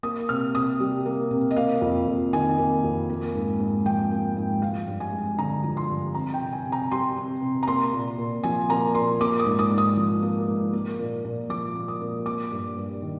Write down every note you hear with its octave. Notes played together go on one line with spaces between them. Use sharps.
A#3 D#6
C3 F6
C3 D#6
G3
A#3
C3
D#5
A#3 F5
F2
F2
D#3 G#5
A#3
F2
A#3
G#2
G#2
F3 G5
A#3
G#2
F3 F5
G2
G#5
G#3
D3 A#5
F3
C6
G2
C4 A#5
G5
C3
G#5
C3
A#5
G3 C6
C4
C3
A#5
A#3 C6
A#2
A#2
F3 G#5
A#3 A#5
A#2 C6
A#3 D6
D#6
G#2
D#6
G#2
D#6
F3
A#3
G#2
A#3
A#2
A#2
F3 D6
A#3
D#6
A#2
A#3 D6
G2
G2
D#3